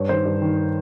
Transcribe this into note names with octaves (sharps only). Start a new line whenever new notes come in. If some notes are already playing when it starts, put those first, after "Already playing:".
Already playing: G2 C#5
D#3 C5
G2
D#3